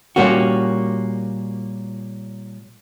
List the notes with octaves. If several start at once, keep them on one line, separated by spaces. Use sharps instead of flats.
A#2 G3 A#3 C#4 F#4